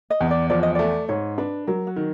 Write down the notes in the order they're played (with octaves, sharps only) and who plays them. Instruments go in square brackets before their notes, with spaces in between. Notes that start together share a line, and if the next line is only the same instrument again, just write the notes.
[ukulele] D#5
[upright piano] E2
[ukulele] D5
[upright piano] F3 [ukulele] D5
[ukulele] D#5
[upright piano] A3 [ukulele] D5
[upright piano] G#2 [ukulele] C#5
[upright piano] D4 [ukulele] B4
[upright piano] F#3 [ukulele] A#4
[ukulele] F#4
[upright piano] D#3